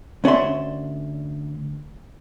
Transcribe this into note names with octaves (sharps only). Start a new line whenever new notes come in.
D2 C#4 D5 E5 C6